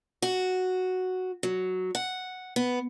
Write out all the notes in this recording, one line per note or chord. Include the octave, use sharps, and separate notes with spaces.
F#4
F#3
F#5
B3